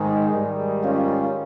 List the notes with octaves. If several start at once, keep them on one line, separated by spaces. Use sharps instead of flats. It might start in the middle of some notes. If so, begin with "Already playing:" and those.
Already playing: G#2 D#3 G#3
G#2 D#3 G3
C#4 F4